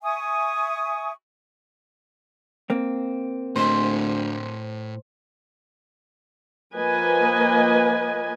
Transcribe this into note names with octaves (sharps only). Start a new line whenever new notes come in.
E5 G#5 C#6 D#6
A#3 C4
D2 A2 C5 D#5
F3 A#3 B4 D#5 G#5